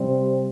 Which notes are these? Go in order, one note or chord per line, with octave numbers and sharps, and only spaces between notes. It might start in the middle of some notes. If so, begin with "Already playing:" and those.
Already playing: C3 G3 C4